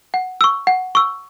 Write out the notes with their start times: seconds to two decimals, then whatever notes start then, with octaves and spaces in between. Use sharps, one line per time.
0.14 F#5
0.41 C#6 E6
0.67 F#5
0.95 C#6 E6